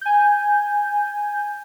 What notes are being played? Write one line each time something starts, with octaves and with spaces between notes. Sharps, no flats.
G#5 G6